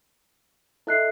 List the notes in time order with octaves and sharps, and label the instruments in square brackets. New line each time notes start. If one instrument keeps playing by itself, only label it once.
[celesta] E4 F#6 C7 [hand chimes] A4 D#5 E5